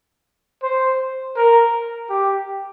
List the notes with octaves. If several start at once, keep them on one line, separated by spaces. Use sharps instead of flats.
C5
A#4
G4